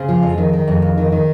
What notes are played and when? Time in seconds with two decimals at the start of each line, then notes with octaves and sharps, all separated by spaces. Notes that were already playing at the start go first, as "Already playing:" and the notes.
Already playing: C#3 G#4 C5
0.09 F3
0.23 F2
0.38 D#3
0.53 D#3
0.67 F2
0.82 F2
0.98 D#3
1.12 D#3